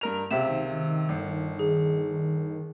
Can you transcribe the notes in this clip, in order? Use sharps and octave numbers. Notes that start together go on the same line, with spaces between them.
G2 A#4 F7
C#2 C3 C5 E5 E7
D#3
G1
G#4